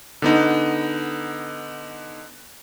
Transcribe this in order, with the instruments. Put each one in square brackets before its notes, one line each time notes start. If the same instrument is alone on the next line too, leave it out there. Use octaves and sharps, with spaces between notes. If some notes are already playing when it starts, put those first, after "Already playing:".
[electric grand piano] D3 B3 D#4